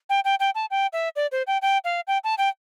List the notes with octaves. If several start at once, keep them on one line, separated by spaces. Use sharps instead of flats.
G5
G5
G5
A5
G5
E5
D5
C5
G5
G5
F5
G5
A5
G5